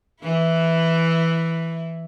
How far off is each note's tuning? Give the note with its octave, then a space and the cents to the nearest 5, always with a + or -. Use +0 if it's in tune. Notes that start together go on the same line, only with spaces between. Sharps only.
E3 +0 E4 +0